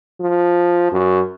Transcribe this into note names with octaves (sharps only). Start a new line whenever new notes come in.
F3
F#2